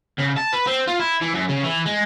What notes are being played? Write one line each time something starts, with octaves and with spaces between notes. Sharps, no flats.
C#3
A5
B4
C4
F4
E4
E3
F#2
C#3
E3
G#3